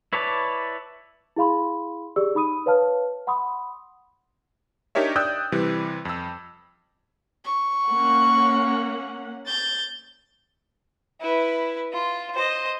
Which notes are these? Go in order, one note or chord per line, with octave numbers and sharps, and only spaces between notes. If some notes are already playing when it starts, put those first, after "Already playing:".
E4 B4 C#5 D5 A5
E4 G#4 F5 B5 C6
G4 G#4 D5 E6
D#4 B5 D#6 D#7
B4 C#5 F5 A5 F6
F#5 B5 C6 D#6
D4 D#4 G4 A#4 C#5 E5
D5 G5 D#6 E6 F#6 G6
C3 E3 G3
F2 E6
C#6
A#3 C#4 F#5
G6 A6
E4 B4
F4
C5 D#5